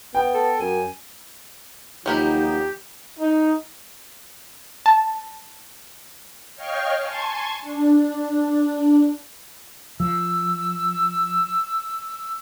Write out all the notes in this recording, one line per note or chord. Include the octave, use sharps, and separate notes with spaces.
B3 G5
A4
F#2 G#5
D#2 F3 F#3 A#3 D#4 G4 D#5 B5
D#4
A5
C#5 D#5 F5 G5 C#6 F6
G#5 A5 C6 C#6 G#6
D4
F3 E6